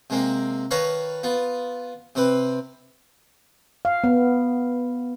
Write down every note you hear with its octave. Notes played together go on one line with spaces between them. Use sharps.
C3 G#3 A#3 C4
D#3 B4 C#5 F5 A5 A#5
B3 F4
C3 C4 B4
F5
B3